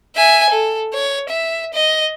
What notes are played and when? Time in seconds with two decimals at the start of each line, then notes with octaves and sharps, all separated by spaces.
0.16 E5 G#5
0.49 A4
0.94 C#5
1.29 E5
1.73 D#5